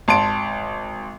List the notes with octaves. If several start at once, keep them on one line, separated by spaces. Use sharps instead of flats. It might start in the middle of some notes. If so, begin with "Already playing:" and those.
G#1 A5 C6 D7